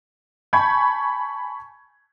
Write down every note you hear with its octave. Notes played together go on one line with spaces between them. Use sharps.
G#5 A5 B5 C#6 G6 G#6